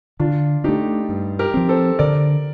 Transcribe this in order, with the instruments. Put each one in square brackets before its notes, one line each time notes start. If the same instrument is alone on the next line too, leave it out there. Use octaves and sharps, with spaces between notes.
[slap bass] D3 [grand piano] D4 F4
[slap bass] A3 D4 [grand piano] D#4 G4
[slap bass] G2
[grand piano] G4 A#4
[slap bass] F3 C4
[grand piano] A4 C5
[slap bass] D3 [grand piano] A#4 D5